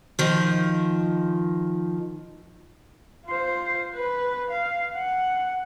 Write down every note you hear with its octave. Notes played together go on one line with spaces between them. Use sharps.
D#3 F3
F4 C5
B4
F5
F#5